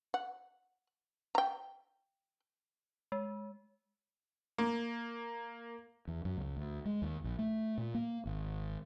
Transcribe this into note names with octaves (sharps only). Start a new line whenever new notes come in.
F#5
G5 A#5
G#3
A#3
E2
F#2
C#2
D2
G#3
D#2
A#1
A3
A#2
A#3
G#1